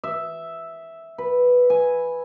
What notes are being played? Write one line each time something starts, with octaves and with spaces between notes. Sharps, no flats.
E5
B4
G#5